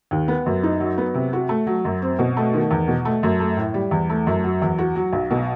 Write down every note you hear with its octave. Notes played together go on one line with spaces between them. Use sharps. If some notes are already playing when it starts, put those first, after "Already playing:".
D#2
B3
F#2
D#4
F#3
B3
C3
F#4
A3
F#3
F#2
C4
B2
A3
D#3
E2
B2
A3
F#2
A3
A2
G3
E2
A3
F#2
F#3
E2
F#4
F#3
B1
B2